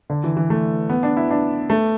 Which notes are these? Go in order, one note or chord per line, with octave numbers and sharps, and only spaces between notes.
D3
E3
E3
A3
B3
D4
E4
D4
A3